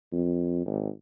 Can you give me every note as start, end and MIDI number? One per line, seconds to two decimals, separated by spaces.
0.12 0.62 41
0.66 0.88 32